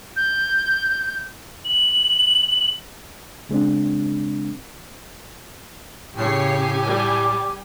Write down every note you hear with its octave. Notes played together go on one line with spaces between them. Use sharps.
G6
F#7
C#3 G#3 C4 D4
A2 C#3 G4 C#5 G#5 C7
G3 D6